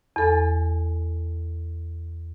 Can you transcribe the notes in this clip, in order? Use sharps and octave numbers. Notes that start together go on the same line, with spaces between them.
E2 A4 G#5